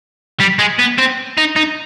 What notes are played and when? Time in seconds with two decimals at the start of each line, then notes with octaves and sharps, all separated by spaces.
0.40 G3
0.59 G#3
0.79 B3
0.99 C4
1.38 D#4
1.56 D#4